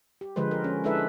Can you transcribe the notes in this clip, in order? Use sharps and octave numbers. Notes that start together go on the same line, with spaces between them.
G4
D3 F3 G#3 B4 C5
A#4
C#4
G#3 D4 E4 A4 B4 E5